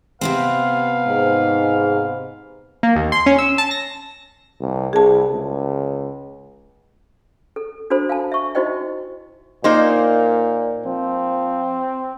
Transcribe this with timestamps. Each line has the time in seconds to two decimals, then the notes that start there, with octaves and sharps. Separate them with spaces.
0.21 C3 B3 C4 B4 F5
1.07 G#2
2.83 A#3
2.96 D#2
3.12 C6
3.26 C#4
3.39 E6
3.58 A5
3.71 A#6
4.60 C2
4.93 C2 G#4 A5
5.32 C#2
7.56 A4
7.90 D4 F#4 A4 C5 B5
8.09 F5 G#5 A5
8.32 E5 C#6
8.55 D#4 E4 F#4 C5 D#5 G5
9.64 A#2 A#3 D#4 C5
10.86 F3 C4